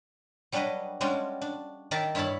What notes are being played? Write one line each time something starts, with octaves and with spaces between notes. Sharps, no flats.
F#3 G3 D4 G#4 B4 D#5
G3 G#3 C#4 D4 F4 F#4
D4
D#3 A#4 D5 E5 A5
G2 E4 C#5 F5 A5 B5